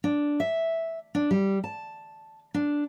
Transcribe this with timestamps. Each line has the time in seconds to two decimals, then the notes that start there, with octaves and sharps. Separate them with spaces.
0.04 D4
0.40 E5
1.15 D4
1.31 G3
1.64 A5
2.54 D4